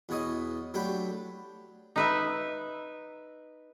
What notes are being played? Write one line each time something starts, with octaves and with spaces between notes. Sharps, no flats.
E2 B2 E3 C#5 D#5 D#6
F#3 A3 D4 G4 G5 B5
D#4 B4 E5